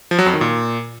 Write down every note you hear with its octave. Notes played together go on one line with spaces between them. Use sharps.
F3
F#3
F2
D#3
A#2